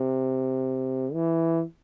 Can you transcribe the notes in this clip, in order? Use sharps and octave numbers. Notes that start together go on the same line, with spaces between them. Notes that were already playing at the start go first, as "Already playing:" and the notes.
Already playing: C3
E3